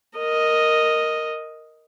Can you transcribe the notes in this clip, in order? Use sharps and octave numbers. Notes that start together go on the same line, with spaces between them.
A#4 D#5